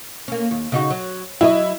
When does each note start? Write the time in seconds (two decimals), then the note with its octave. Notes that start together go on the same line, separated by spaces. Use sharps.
0.28 A#3 C#4
0.51 D#2
0.72 C#3 D#4 F#4
0.90 F#3
1.41 F#3 E4 G#4 D#5